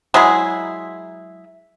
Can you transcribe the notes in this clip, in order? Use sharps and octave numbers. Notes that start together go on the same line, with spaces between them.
F#3 G#3 E4 G#4